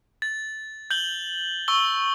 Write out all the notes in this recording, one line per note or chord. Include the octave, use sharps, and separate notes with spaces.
A6
G6 F#7 G7
C#6 E6 G7